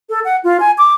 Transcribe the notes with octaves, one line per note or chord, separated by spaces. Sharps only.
A4
F#5
F4
G#5
D6